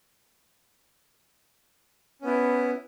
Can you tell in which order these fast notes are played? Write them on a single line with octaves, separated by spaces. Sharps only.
C#4 B3 E4